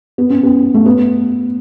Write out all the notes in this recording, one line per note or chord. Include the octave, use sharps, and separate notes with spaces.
B3
C#4
B3
A3
B3